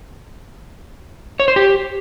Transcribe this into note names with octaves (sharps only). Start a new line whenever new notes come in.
C#5
C5
G4